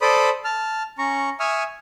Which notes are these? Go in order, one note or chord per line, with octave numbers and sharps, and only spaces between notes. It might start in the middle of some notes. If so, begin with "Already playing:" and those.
A4 C5 D5 B5 D#6
A5 F6
C#4 A#5 C#6
E5 G#5 C#6 D#6 F6